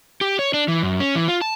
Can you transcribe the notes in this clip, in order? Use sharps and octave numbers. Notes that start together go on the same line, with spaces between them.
G4
C#5
D4
E3
F#2
C#4
E3
F4
A5